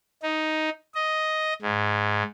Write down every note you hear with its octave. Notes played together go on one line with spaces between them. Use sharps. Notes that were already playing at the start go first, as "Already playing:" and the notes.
D#4
D#5
G#2